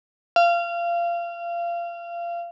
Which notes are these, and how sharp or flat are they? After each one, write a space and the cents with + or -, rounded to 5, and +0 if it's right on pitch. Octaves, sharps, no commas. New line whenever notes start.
F5 -25